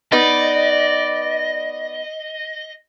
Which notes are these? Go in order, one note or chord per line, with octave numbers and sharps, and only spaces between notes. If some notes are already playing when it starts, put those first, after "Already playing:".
B3 D#4 B4 D5 D#5